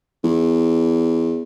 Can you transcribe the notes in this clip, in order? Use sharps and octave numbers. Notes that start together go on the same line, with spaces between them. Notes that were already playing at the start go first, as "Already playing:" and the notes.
E2